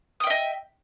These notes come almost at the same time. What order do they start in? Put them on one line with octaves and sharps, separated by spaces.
D#6 G5 E5 D#5